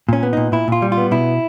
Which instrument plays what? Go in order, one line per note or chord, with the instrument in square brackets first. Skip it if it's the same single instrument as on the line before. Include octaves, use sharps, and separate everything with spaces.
[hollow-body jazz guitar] A#2 C#4
B3
A#2 D#4
A#2 E4
A#2 F4
G3
F4
B3
B2 E4